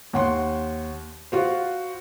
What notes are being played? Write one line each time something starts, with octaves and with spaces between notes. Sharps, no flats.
D#2 F#5 C6
F4 F#4 C5